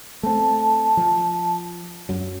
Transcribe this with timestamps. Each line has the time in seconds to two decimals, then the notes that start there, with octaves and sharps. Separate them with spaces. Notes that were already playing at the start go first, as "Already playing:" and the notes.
0.23 A3 C4 A5
0.97 F3
2.09 F#2 F#3